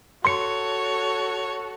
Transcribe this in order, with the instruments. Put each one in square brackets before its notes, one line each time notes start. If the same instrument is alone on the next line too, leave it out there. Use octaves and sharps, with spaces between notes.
[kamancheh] F#4 A4 [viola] C#5 [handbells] C6 C#7